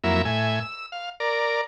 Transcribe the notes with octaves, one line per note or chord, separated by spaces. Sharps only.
F2 F#3 A#3 E4 E5
A2 E5 G#5
E6
F5
A#4 D5